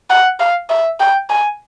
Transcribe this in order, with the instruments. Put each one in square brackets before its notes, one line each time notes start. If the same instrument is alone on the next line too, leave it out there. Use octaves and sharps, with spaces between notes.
[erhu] F#5
F5
E5
G5
G#5